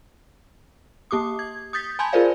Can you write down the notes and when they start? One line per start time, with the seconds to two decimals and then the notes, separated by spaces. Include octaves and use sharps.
1.11 A#3 G4 D6 D#6
1.39 G#6
1.73 D#6 G6 A6 B6
1.99 G#5 A5 B5 C6 G6 G#6
2.13 F4 G#4 A#4 C5 D5 F5